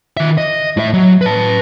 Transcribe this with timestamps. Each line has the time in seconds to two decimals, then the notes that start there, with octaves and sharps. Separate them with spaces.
0.17 D#3 E5
0.38 D#5
0.77 A2 E5
0.93 F#3
1.21 B4 A5